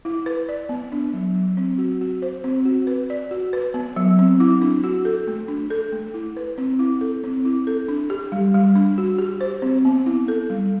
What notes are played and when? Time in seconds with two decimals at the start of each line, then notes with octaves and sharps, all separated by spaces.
0.05 E4
0.26 B4
0.49 D5
0.69 B3
0.92 D4
1.14 F#3
1.35 F#3
1.57 C4
1.78 F#4
2.01 F#4
2.22 C5
2.44 C4
2.65 F#4
2.87 B4
3.10 D5
3.31 F#4
3.53 B4
3.74 B3
3.96 F#3
4.19 C4
4.40 E4
4.62 D4
4.84 F#4
5.05 A4
5.28 A3
5.48 D4
5.70 A4
5.92 A3
6.14 E4
6.37 B4
6.58 C4
6.79 E4
7.01 A4
7.24 C4
7.45 E4
7.67 A4
7.88 D4
8.10 G4
8.32 G3
8.54 G3
8.75 D4
8.98 F#4
9.18 G4
9.41 C5
9.62 C4
9.85 B3
10.06 E4
10.28 A4
10.50 G3